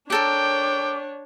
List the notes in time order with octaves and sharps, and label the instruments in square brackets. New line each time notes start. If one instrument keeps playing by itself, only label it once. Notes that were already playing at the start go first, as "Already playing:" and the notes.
[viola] D4 C#5 [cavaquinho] G4 A4 A#4 [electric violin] G5 [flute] D6